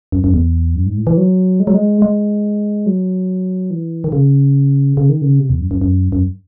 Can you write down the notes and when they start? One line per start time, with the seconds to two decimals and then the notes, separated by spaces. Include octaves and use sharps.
0.12 F#2
0.24 F#2
0.34 E2
0.75 F#2
0.86 G#2
0.97 A2
1.07 E3
1.18 F#3
1.60 G#3
1.67 F#3
1.74 G#3
2.02 G#3
2.86 F#3
3.71 E3
4.04 D#3
4.12 C#3
4.97 C#3
5.09 D#3
5.22 C#3
5.39 C3
5.50 E2
5.60 F#2
5.71 F#2
5.81 F#2
6.12 F#2